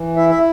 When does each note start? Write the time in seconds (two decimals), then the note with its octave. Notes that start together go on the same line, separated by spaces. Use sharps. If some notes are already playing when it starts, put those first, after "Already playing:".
Already playing: E3
0.16 E4 E5
0.29 E5